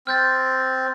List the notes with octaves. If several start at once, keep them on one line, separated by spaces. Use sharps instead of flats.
C4 F6 G6 A6